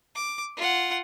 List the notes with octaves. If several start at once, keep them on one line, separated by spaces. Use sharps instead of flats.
D6
F4 F#5